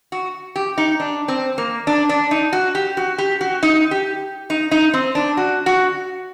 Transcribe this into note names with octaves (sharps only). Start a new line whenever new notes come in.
F#4
G4
D#4
D4
C4
A#3
D4
D4
D#4
F#4
G4
F#4
G4
F#4
D#4
G4
D#4
D#4
C4
D4
F#4
F#4